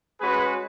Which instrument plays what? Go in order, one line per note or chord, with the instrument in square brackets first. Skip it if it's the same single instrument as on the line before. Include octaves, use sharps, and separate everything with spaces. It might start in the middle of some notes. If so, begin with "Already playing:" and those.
[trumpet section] G#3 C#4 F#4 G#4 B4